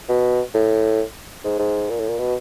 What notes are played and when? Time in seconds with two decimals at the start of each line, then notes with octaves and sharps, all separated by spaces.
0.09 B2
0.54 A2
1.44 G#2
1.59 G#2
1.90 A#2
1.99 A2
2.09 A#2
2.19 B2